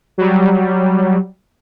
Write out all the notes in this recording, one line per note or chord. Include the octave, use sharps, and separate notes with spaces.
F#3 G3